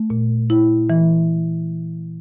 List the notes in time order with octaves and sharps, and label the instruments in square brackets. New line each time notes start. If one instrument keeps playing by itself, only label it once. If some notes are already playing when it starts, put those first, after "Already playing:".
Already playing: [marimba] A3
A#2
E4
E3